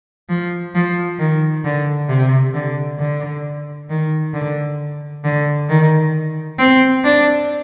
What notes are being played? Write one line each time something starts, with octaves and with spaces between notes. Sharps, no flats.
F3
F3
D#3
D3
C3
D3
D3
D#3
D3
D3
D#3
C4
D4